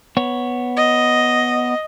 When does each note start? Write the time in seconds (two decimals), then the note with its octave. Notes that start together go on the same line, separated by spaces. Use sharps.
0.17 B3 C#5
0.76 D#5